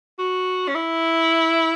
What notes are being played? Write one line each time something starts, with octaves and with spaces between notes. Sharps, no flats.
F#4
C#4
E4